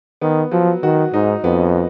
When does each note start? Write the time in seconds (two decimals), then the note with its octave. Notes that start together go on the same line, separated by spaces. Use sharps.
0.21 D#3 B3
0.52 F3 F#3
0.83 D#3 F#4
1.13 G#2 D#4
1.44 F2 B3